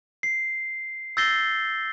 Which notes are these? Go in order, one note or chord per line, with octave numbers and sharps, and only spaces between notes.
C7
E6 G6 A6 A#6 C7 G7